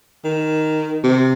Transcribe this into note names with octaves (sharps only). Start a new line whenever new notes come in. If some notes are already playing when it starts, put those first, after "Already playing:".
D#3
C3